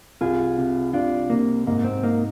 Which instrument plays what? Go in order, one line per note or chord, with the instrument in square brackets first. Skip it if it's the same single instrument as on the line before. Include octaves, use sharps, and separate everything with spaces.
[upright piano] C2 [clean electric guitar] F4 G#4
[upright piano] C3
[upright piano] C2 [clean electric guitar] D4 F4
[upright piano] C3 [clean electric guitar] A#3
[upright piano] G#2 [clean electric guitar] A#3
[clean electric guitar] C4
[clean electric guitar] A#3 [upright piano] D#4